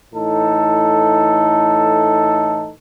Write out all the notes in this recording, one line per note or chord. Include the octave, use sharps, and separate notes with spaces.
A2 E3 D#4 A4